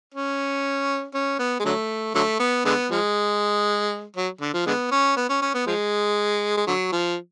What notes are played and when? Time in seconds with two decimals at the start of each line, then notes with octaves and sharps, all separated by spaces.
0.15 C#4
1.15 C#4
1.40 B3
1.60 G#3
1.65 D3 F#3 A3
2.15 D3 F#3 A3
2.40 B3
2.65 D3 G#3 B3
2.91 F3 G#3
4.16 F#3
4.41 D3
4.54 F3
4.66 D3 G#3 B3
4.92 C#4
5.17 B3
5.30 C#4
5.42 C#4
5.54 B3
5.67 F3 G#3
6.57 G#3
6.67 D3 F#3
6.93 F3